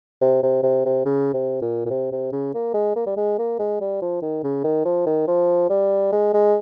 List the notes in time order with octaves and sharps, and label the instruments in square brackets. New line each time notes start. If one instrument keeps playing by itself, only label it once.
[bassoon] C3
C3
C3
C3
C#3
C3
A#2
A#2
C3
C3
C#3
A#3
G#3
A#3
G3
G#3
A#3
G#3
G3
F3
D#3
C#3
D#3
F3
D#3
F3
G3
G#3
G#3